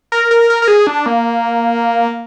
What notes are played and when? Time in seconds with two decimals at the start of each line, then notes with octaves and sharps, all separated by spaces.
0.12 A#4
0.31 A#4
0.50 A#4
0.62 A#4
0.68 G#4
0.87 D4
1.06 A#3